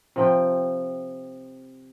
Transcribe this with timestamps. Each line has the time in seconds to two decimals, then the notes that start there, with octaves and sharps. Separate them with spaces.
0.16 C3 F3 G5